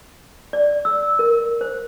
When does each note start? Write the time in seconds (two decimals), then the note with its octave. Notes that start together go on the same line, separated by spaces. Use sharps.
0.53 D5
0.85 E6
1.19 A#4
1.61 C5